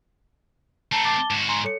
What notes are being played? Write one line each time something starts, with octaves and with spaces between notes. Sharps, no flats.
A3 C4 A5 A#5 C#7
A5 D6 A6
G#2 F#4 E7
G#5 A#5 C6
A4 C#5 C#7